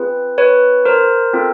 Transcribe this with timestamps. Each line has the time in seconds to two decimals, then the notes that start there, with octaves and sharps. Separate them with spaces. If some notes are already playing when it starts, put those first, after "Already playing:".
Already playing: C4 F4 G#4 B4
0.38 B4 C#5
0.85 A#4 C5
1.33 C4 F4 A4